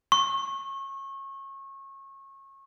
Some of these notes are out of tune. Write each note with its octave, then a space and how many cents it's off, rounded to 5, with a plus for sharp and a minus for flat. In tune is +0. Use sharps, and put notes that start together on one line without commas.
C#6 -25